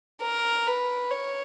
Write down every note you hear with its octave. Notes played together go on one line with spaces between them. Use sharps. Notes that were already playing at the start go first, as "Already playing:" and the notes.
A#4
B4
C#5